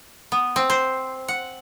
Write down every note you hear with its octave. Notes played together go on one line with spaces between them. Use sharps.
B3
C4
C5
F#5